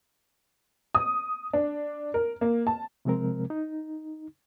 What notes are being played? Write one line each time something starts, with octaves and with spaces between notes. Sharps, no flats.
D#6
D4
A#4
A#3
A5
C3 F3 G#3 C4 A#4
D#4